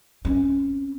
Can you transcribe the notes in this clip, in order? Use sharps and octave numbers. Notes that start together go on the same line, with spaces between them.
C4 C#4